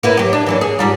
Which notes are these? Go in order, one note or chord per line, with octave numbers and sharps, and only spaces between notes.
A#3 E4 B4
F#3 G4
D4
E3 F#3 A#3
G#4
G#2 G3 F4